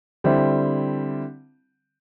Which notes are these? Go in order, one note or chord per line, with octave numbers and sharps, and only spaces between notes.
D3 G3 C4 E4